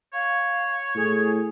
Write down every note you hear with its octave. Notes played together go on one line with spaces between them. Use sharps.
C#5 F5
A2 G#4